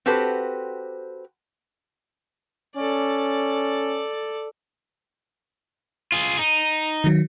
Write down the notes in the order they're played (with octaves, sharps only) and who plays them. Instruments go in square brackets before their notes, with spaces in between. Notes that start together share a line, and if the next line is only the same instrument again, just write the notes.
[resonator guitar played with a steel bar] C4 F#4 G4 A4 B4 C5
[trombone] C#4 [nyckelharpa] A4 D5
[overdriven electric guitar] F4 G#4
D#4
[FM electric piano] D#3 F#3